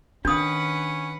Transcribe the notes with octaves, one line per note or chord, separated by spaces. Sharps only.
D#3 C#4 D4 B4 F#5 D#6